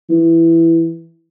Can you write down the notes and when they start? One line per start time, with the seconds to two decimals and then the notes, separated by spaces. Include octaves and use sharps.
0.09 E3